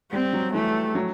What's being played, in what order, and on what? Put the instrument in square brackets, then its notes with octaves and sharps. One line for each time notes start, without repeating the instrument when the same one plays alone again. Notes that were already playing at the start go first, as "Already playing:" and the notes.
[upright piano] G3 [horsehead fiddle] C4
[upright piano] F#3
[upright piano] E3 [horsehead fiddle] A3
[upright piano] F#3